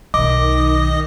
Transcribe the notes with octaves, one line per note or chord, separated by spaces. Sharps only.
B1 D#3 D#5 D6